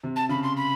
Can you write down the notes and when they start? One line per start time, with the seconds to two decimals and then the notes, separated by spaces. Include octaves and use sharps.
0.04 C3
0.16 A5
0.29 C#3 B5
0.43 C6
0.57 B5